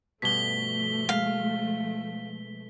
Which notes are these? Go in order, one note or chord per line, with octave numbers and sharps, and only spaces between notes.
G2 B2 F3 A3 B6 G7
G#3 F5